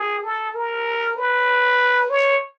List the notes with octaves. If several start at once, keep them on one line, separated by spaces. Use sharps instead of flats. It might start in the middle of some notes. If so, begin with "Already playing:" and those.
Already playing: G#4
A4
A#4
B4
C#5